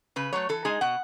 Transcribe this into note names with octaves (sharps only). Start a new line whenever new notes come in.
C#3 B4
F#3 A3 C#5
E3 A4
G#3 D#4 G#4
B2 F#5